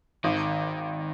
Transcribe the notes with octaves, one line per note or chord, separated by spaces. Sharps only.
G#1 D#3